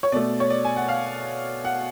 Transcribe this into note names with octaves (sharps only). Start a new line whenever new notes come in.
C#5
B2 A3 D5
C#5
D5
G#5
F#5
F5
F#5